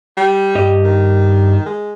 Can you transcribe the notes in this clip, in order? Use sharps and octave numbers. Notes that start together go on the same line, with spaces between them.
G3
G2 G4 D#5
D#3
G#3